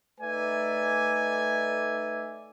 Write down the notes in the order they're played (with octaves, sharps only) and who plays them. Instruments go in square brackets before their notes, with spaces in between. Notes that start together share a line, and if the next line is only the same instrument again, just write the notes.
[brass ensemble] A3 D#4 B4 D5 E5 G#5